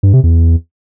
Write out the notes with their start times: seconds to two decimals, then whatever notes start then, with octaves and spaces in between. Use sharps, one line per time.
0.03 G2
0.13 C3
0.23 E2